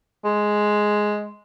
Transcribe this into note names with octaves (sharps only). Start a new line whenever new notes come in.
G#3